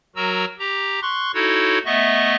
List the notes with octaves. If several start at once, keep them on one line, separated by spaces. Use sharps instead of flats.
F#3 F#4 A#4 A#5 E6
G4 A#5
C6 C#6 F#6
D#4 E4 F#4 A4 C#5
A3 B3 D#5 E5 C#6